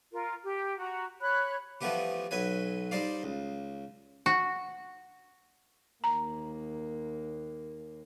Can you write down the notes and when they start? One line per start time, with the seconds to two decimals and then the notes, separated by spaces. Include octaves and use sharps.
0.12 F4 A#4
0.44 G4
0.79 F#4 A#5
1.21 C#5 B5 F#6
1.81 E3 F3 G3 A3 B3 G4
2.31 B1 F#3 B4 G#5
2.91 G3 D#4 C5 D5 F5
3.23 C#2
4.26 F#4
6.04 D#2 A#3 A#5